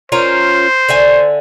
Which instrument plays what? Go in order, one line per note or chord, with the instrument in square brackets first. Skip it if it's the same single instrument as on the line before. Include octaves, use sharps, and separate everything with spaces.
[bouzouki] C#4 F4 A#4 [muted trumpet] C5
[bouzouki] D3 E5 G#5